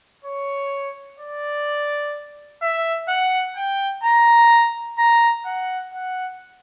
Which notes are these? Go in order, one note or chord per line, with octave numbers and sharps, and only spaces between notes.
C#5
D5
E5
F#5
G5
A#5
A#5
F#5
F#5